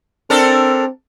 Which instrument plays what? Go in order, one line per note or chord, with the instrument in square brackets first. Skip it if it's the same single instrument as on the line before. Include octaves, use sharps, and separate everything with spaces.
[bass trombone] C4 [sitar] D4 A4 A#4